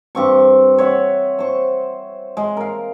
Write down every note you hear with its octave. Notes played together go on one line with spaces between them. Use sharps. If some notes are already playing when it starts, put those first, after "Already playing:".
G2 C4 C#6
C#5 E5 F#5
C5 C#6
G#3
A#4 F5